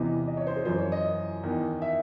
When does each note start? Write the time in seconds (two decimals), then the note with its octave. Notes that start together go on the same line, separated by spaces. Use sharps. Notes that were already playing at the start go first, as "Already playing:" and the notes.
Already playing: E2 C3 E3 D#5
0.27 D#5
0.37 C#5
0.47 C5
0.57 G#4
0.65 F#2 E3 C5
0.79 C#5
0.92 D#5
1.43 E2 D#3
1.82 E5